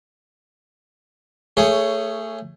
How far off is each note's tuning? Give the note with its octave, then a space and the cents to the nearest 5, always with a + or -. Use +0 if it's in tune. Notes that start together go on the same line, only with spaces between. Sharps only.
A3 +25 G#4 +0 C#5 +0